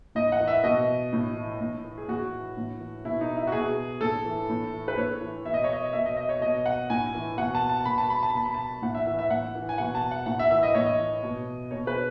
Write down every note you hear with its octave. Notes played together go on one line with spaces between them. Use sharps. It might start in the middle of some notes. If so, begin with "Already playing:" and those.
A2 D#5
F#5
E3
E5
B2 D#5
A2
E3
A2
E3
G#4
A2 F#4
E3
A2
E3
B2 E4
D#4
E4
F#4
B2 G#4
A2 A4
E3
A2
E3
B4
A2 C#5
E3
B2 E5
D#5
C#5
D#5
B2 E5
D#5
D#5
C#5
B2 D#5
F#5
A2 G#5
E3
B2 F#5
A5
A5
B2 B5
A5
B5
A5
B5
B2 A5
B5
A5
A2 F#5
E5
E3 E5
E5
A2 F#5
E3
G#5
B2 F#5
A5
F#5
A2 F#5
E5
E3 E5
D#5
A2 C#5
D#5
E3
B2
B2 C#5
B4